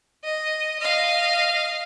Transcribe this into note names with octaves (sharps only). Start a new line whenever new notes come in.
D#5
D#5 F5